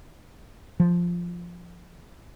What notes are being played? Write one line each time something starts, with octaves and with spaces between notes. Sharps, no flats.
F3